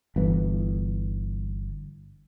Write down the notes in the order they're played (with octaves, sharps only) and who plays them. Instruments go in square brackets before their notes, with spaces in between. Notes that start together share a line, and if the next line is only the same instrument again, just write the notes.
[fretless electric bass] G1 E3